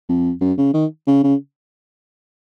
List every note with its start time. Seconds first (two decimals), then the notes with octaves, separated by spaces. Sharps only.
0.09 F2
0.41 F#2
0.58 C#3
0.74 D#3
1.07 C#3
1.23 C#3